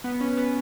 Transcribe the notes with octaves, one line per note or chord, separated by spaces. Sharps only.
B3
C#4
B3